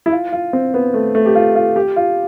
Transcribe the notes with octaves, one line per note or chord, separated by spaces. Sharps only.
E4
F4
F4
C4
B3
A3
A3
G4
F4
F4
G4
F4